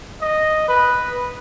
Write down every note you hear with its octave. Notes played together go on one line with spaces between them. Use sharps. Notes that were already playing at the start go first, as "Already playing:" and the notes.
D#5
B4